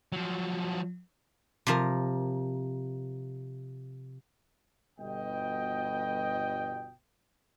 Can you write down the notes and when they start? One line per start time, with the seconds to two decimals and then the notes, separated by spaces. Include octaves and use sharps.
0.12 F3 F#3
1.67 C3 F3 A#4
4.99 G1 B2 D#5 G5